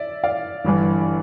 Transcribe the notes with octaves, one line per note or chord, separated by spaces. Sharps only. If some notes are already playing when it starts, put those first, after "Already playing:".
Already playing: D5 E5
D5 F5
G1 G2 E3